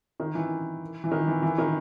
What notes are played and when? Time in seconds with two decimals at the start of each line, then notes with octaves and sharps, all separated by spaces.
0.20 D#3
0.35 E3
1.04 E3
1.11 D#3
1.28 E3
1.43 E3
1.58 D#3